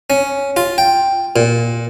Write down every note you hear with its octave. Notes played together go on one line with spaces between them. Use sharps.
C#4
F4
G5
A#2